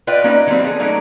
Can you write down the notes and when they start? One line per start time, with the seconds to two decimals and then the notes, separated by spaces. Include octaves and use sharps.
0.07 F4 B4 D5 D#5 G5
0.24 A#3 C#4 D#4 B4
0.47 D#3 F#3 G3 A#3 C4
0.64 G#4 A4
0.79 F#3 A3 A#3 C#4 D#4 D5